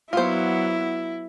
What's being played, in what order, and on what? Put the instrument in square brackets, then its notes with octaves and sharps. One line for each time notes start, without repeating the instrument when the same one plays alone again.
[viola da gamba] F#3 B3 [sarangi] E4 [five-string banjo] F4 C5